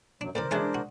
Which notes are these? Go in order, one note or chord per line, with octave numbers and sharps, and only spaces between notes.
F#2 F#3 D4
A2 C#3 E3 A#4 C5 D5
E3 G#3 C#4 D4 G#4 A4 C#5 D5
F#4